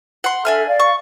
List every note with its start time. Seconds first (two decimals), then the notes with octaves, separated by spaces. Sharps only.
0.24 F#5 C6
0.45 D4 A4 E5 G#5 F6
0.67 D5 F5
0.80 C#6